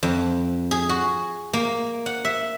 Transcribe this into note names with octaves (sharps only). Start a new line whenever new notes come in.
F2
G#4
F#4
A#3
F#5
E5